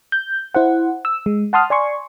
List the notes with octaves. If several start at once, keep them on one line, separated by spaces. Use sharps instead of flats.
G6
E4 C5 F#5
E6
G#3
F#5 A5 C6 D#6 F6
D5 G#5 C6 C#6